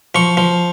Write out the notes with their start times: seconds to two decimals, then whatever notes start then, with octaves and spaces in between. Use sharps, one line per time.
0.15 F3 C#6
0.37 F3